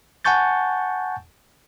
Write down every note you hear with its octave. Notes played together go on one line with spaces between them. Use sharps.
F#5 G#5 A5 C#6 G6 A6